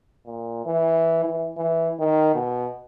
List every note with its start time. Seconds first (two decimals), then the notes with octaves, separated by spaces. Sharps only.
0.27 A#2
0.66 E3
1.25 E3
1.57 E3
2.00 D#3
2.35 B2